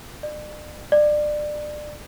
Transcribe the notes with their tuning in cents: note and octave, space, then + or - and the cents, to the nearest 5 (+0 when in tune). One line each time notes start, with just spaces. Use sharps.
D5 +45
D5 +25